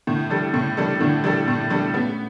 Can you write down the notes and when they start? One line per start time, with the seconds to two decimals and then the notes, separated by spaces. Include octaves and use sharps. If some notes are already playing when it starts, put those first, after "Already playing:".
0.07 A2 D3
0.30 G3 D4 A4
0.54 A2 C#3
0.77 G3 D4 A4
1.00 A2 D3
1.24 G3 D4 A4
1.48 A2
1.70 G3 D4 A4
1.94 A3 B3 C#4